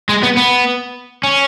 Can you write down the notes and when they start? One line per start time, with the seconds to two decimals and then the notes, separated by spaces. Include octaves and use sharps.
0.09 G#3
0.23 B3
0.37 B3
1.24 C#4